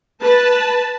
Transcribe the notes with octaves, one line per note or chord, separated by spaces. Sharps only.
B4 A5